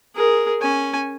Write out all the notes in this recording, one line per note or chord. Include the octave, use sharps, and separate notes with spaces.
G#4 A#4
C#4 G#5